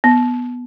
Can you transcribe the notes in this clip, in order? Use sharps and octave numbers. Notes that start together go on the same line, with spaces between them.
B3